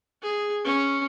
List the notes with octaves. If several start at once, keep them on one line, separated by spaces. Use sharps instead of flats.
G#4
C#4